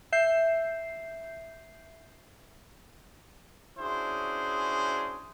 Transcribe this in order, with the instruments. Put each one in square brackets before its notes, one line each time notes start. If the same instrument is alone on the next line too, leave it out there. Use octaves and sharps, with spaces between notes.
[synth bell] E5 G6 C7
[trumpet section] C#4 D4 E4 F#4 G#4 C5